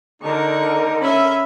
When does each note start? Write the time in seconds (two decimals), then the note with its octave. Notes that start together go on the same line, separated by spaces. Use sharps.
0.22 D3 D4 D#4 A#4 C#6
1.01 C#4 E5 B5